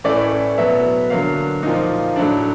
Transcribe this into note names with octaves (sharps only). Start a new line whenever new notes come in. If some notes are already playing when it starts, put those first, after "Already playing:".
A2 E3 A3 C#4 D5
B2 F#3 B3 E5
D3 F#3 A#3 F5
A#2 F3 A#3 D#4
A2 F#3 A3 D4